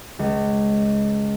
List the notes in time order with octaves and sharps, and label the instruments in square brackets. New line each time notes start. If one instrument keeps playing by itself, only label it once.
[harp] C#2